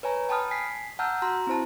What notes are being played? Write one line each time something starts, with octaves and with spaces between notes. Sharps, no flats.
B4 C#5 G#5 A#5
G5 A5 B5 D#6 F6
G#5 B6 C7
F#5 A5 A#5 E6 F6 G6
F#4 A#5 C6
C4 E4 C5 A5